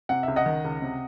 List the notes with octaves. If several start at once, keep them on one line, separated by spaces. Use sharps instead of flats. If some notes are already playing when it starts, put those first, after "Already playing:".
C3 F#5
C#2 E5
D#5 F#5
D#3
C#2
C3